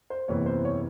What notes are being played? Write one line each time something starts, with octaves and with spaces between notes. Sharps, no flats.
C5
F#1 E2 C3 E3 C#5
C5
C#5